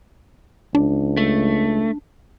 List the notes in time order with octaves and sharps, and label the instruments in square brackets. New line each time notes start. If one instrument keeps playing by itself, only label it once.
[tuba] C#2 [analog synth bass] D4
[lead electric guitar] A3